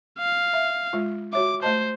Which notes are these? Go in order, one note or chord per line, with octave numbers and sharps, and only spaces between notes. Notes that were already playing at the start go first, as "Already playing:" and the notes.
F5
E5
G#3 F4
F#4 C#5 E5 D6
A3 C5 D#5 A5